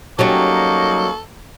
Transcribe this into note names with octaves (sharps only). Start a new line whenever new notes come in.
F#3 G3 A#3 C#4 D#4 A4 C#6